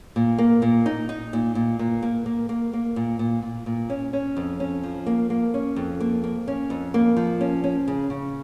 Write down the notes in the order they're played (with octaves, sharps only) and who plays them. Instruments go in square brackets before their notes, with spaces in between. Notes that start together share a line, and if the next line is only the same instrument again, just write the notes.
[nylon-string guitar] A#2
A#3
A#2
D#4
D#4
A#2
A#2
A#2
A#3
A#3
A#3
A#3
A#2
A#2
A#2
A#2
C#4
C#4
F2
C#4
F3
A#3
A#3
C#4
F2
A#3
A#3
C#4
F2
A#3
F3
C#4
C#4
C#3
C#3